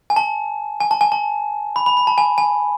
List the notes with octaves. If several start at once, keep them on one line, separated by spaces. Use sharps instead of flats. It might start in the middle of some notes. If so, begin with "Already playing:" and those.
G#5
A5
G#5
A5
G#5
A5
B5
B5
B5
A5
G#5
G#5